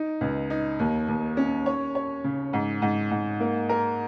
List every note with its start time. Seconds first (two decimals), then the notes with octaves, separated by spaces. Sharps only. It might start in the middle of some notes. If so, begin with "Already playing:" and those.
Already playing: D#4
0.21 C#2
0.50 D#4
0.79 D#2
1.08 D#2
1.37 C#4
1.66 C#5
1.95 C#5
2.24 C#3
2.53 G#2
2.82 G#2
3.11 G#2
3.40 A#3
3.69 A#4